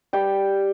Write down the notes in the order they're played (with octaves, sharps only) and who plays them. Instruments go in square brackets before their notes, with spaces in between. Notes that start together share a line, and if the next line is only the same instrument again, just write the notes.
[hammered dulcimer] G3 G5